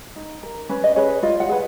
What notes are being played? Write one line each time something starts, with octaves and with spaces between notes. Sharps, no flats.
D#4
A#4
C#4 B4
D#5
G#4 B4 C#5
F4 D#5
F#5
G#4 B4